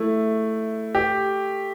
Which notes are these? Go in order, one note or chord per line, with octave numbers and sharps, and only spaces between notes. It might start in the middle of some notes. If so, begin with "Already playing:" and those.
Already playing: A3 E4
G4